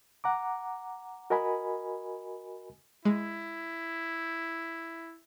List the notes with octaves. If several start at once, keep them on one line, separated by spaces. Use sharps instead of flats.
F#5 A#5 D6
F#4 A#4 D#5 G#5 B5
G#3 E4